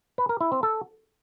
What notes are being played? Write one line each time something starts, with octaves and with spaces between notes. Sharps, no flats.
B4
A#4
E4
C4
A4